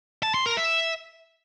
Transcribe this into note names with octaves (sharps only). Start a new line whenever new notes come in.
A5
C6
A#4
E5